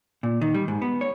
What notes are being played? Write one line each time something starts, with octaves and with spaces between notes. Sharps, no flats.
A#2
D#3
G3
G#2
B3
C#5